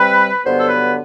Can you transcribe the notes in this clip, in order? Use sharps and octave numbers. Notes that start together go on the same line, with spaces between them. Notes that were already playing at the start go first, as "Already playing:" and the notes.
Already playing: C3 G3 C4 B4
G2 D3 F#3 B3 C5
A4
B4